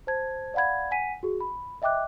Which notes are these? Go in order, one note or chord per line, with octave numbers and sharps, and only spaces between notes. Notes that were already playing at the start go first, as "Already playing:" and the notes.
C5 A5 G#6
D5 F5 F#5 B5 G#6
F#5 G#5 B6 D#7
F#4 G#4
B5
D#5 E5 G5 D6 F#6